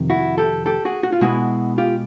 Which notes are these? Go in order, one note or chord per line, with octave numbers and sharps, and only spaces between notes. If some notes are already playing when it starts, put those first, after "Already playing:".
Already playing: F2 C3 D#3
E4 F#4
G4 A4
G4 A4
F#4 G#4
F#4
F4
B2 G#3 B3 E4 F#4
F4 G4